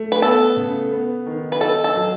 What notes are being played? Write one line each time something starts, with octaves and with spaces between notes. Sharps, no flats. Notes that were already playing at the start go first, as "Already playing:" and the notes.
Already playing: A3
B4
B3 A4
C#3
B3
D#3
B4
D#4 A4
A4
F#3